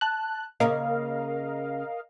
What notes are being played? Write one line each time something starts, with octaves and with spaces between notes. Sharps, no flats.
A5 F#6
C#3 A#3 C#4 A#4 D#5 F5